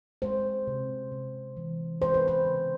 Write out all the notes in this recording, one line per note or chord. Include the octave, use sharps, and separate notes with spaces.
G#3 C5
C3
C3
E3
G#3 C5
B4
C5
C#3